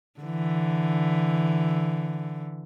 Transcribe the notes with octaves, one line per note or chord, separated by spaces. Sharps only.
D3 E3